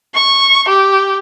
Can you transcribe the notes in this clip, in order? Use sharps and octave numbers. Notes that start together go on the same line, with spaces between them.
C#6
G4